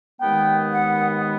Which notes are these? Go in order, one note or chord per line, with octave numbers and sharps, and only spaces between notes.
D#2 D#3 G#3 B3 G5
F#5